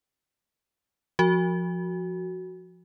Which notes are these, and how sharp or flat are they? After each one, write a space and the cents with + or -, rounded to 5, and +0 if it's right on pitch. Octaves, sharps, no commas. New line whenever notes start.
F3 +0 F#4 +0